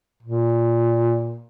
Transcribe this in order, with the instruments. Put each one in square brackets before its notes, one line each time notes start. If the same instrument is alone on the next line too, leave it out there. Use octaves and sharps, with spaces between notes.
[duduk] A#2